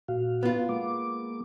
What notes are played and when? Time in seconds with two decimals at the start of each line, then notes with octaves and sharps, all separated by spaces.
0.08 A#2 F#4 F5
0.43 B3 F4
0.69 G#3 A#3 D6